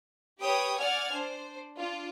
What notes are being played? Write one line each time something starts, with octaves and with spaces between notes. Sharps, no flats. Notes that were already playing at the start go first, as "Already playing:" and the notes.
G4 B4 C#5 G5 D#6
D5 F#5 G#5 F6 G#6
D4 C5
D4 F4